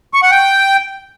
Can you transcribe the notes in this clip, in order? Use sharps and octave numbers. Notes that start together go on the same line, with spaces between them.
C#6
F#5
G5